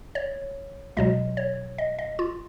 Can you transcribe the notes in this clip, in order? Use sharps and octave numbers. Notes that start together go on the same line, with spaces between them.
C#5
C#2 B2 F#3 D#5
C#5
D#5
D#5
F4